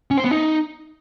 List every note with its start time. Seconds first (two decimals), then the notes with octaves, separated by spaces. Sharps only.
0.11 C#4
0.18 C5
0.24 B3
0.31 D#4